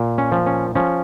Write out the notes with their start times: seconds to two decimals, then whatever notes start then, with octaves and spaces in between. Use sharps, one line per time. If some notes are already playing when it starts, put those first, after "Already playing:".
Already playing: A#2
0.18 C#4
0.32 F3
0.46 C#4
0.75 F3 C#4